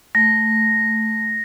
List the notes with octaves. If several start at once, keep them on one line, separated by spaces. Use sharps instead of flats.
A3 A#6